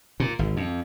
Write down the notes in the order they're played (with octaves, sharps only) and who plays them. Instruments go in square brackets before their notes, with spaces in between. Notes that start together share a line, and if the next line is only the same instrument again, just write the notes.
[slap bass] A#2
G#1
F2